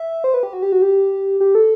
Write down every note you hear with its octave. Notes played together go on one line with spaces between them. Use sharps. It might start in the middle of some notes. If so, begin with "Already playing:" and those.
Already playing: E5
C5
B4
G4
F#4
G4
F#4
G4
G4
A4